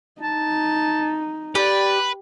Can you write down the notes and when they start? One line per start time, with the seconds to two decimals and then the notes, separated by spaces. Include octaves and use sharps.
0.21 D#4 A5
1.55 G4 B4 D5